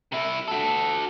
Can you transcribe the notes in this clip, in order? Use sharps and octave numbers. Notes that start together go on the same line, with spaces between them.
C3 E4
F#4 A4